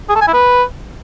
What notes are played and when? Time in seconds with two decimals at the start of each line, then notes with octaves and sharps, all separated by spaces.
0.09 G#4
0.15 A4
0.21 G#5
0.27 E4
0.34 B4